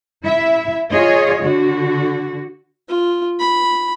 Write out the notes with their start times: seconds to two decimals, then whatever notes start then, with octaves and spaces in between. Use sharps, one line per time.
0.23 E4 E5
0.90 F4 G#4 C#5 D#5
1.42 D3 F#4
2.88 F4
3.39 B5